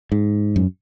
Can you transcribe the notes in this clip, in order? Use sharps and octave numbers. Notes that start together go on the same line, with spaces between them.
G#2
F#2